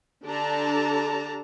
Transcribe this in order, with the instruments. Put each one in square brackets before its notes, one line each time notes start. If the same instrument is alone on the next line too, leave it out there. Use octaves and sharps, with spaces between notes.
[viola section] D3 D4 G4 A4 A5 A#5